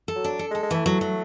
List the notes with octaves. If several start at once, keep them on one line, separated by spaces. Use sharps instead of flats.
A4
F#3
D4
A4
G#3
A4
G#3
E3 A3
F#3
F#3